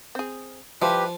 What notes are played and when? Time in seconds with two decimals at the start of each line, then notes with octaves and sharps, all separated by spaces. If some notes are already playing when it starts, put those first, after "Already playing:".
0.15 C4 G#4
0.82 F3 G3 E4 F4 G4 B4